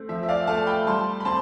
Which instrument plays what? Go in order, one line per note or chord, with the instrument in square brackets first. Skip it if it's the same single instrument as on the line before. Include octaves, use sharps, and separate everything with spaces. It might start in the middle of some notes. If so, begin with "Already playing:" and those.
Already playing: [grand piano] A3 C4
F3 E5
E5
D5 F5
A3 F5 A5
G5 B5
G3 A5 C6
B5
C4 A5 C6